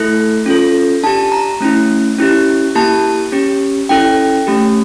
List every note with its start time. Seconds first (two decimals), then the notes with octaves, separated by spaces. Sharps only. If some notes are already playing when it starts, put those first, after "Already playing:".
Already playing: A3 E4 A4
0.46 C#4 F4 A4
1.03 D4 G4 A5
1.32 A#5
1.61 A3 C#4 E4
2.19 C#4 E4 G4
2.75 A#3 E4 G4 A5
3.32 C#4 G4
3.89 C#4 E4 A4 G5
4.47 A3 C#4 G4